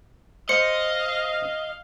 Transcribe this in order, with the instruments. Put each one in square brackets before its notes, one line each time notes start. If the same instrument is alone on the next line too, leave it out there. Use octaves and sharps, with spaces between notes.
[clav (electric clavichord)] C5 [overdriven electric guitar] D#5 [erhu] F5 [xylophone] C#7